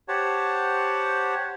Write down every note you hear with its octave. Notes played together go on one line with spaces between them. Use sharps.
G4 C5 C#5 F#5 A5